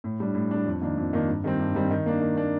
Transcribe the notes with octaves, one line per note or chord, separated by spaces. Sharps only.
A2
G3 D4
A2
G3 D4
F2
D#3 A#3 D4
F2
D#3 A#3 D4
G2
D#3 G3 C4
G2
D#3 G3 C4
D#3
A#3 D4
D#3
A#3 D4